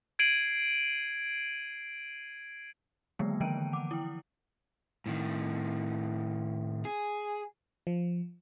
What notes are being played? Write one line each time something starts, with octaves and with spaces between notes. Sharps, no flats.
G#6 C7 D7 D#7 F#7
D3 D#3 F#3 G#3 A#3 B3
D3 E3 F3 G5 D7 D#7
F#5 D6
E4 G5
A2 D#3
G#4
F3